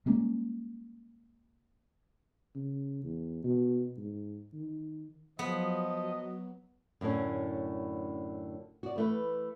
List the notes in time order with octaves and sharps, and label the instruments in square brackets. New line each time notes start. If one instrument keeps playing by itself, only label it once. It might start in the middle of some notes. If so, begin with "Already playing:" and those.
[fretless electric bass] G3 G#3 A#3 C#4
[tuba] C#3
E2
B2
G#2
D#3
[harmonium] F3 [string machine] F#3 [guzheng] B3 [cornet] D#5
[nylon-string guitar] F#2 A2 D3 C#4
F#4 D5
E3 A3 B4